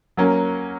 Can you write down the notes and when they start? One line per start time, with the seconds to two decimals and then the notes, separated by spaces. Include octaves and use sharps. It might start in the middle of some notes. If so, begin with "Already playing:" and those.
0.17 F#3 A#3 C#4